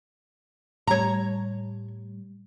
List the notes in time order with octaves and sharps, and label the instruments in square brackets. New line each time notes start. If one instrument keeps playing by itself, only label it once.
[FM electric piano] A2 G3 [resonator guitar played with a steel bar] C#5 A#5